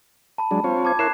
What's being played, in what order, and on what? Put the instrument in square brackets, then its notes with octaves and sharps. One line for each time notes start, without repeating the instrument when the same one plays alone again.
[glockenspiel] A5 B5
[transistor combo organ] F#3 G#3 D4
C4 F4 C#5
[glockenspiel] A5 D6 G#6
[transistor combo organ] E4 A#4 C#5 [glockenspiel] F#6 C7 E7